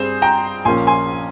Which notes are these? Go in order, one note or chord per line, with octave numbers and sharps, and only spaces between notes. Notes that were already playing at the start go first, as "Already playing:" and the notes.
Already playing: G2 G3 C4 G#4 C5
G5 A#5
A#1 A#2 F3 A#3 C#4 G#5 C6
G#5 C6